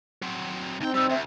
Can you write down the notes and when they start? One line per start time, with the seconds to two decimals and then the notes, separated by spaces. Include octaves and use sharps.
0.22 F#3 C4
0.81 D2 C4 D#4 G5
0.94 G3 D#4 E6
1.10 D2 E5